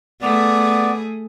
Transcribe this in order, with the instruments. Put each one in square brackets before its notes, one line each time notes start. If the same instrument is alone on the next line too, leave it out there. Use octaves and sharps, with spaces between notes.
[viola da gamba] A3 G#4 [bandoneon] B3 D5